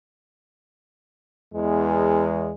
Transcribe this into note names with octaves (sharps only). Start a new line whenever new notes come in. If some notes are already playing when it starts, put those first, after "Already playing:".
E2 G#3